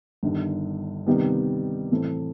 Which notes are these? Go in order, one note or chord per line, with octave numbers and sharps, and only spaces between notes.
G1 G2 D#3
C3 D#3 G3 B3
A2 E3 A3 C4